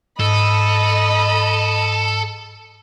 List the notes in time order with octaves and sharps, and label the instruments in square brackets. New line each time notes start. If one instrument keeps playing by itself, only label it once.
[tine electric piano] G#2 [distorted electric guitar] A4 [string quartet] D#5 B5